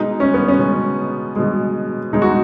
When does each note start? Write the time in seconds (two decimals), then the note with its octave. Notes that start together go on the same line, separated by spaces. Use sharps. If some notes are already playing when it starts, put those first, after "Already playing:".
Already playing: B2 G#3 D#4
0.20 C#4
0.34 B3
0.48 C#4
0.59 B2 G#3
1.36 B2 G#3
2.13 B2 G#3 D#4
2.22 F#4